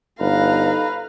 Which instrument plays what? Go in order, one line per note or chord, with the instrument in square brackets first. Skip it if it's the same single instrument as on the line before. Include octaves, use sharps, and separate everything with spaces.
[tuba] G1 [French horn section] D#4 A4 [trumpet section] B4 [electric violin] F5 A#5